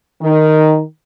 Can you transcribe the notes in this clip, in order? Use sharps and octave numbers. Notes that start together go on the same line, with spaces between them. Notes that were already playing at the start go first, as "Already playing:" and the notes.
D#3